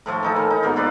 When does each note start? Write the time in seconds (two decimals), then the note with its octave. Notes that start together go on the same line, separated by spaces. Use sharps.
0.06 A2 F3 A3
0.23 E3 D#4 A4
0.36 E3 A#4
0.50 D#4
0.63 G#2 B2 A#3 F4
0.76 E4 F4 B4 D5